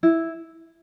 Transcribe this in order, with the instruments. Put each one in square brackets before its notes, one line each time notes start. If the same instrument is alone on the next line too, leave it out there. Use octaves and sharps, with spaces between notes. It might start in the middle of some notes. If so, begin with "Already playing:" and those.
[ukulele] E4